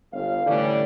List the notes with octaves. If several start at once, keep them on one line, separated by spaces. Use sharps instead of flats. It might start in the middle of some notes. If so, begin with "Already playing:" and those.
G1 F5
A2 D3 E3 G3 C#4 D4